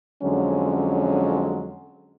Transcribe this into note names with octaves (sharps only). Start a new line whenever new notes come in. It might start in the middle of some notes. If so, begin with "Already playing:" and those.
F2 D3 F#3 G#3 C#4